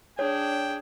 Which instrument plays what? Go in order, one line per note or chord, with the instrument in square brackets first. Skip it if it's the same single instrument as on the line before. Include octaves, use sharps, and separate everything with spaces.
[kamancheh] D4 G#4 [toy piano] C#5 [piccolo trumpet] G5